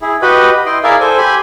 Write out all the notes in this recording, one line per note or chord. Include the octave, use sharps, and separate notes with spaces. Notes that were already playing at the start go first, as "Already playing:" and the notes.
E4 G#4
F#4 G4 B4 D#5 B5
E4 D#5 G5 C6
E4 G#4 A#4 D5 E5 F5
A4 C5 G#5
G4 G#5 B5 C6